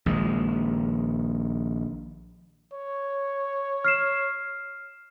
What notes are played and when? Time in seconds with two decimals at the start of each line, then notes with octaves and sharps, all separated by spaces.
0.06 A#1 D#3 G#3
2.74 C#5
3.84 F6 C7 E7